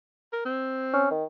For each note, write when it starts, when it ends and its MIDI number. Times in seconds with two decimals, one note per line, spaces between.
0.33 0.42 70
0.45 1.12 60
0.93 1.08 61
1.11 1.24 51